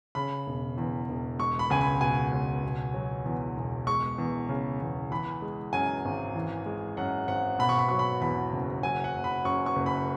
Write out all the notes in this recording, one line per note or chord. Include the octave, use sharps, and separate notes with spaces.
C#3 B5
E1
E2
E1
G#3 C#6
B5
C#2 G#5
B5
B2 G#5
C#2
B2
F#3
E2
E1
G#3 C#6
E2
C#3
E2
E3 B5
G#3
F#2 G#5
G#1
E3
G#3
F#2 F#5
G#1 F#5
B2 B5
C#6
B5
F#3 C#6
B5
E2 B5
F#1
F#3 G#5
F#5
F#1
B5
F#2 C#6
C#6
F#1
B5